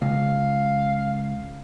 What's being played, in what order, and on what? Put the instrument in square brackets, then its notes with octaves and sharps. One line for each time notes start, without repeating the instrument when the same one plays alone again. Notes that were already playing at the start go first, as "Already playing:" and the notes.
[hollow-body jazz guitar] C#2 [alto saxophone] F5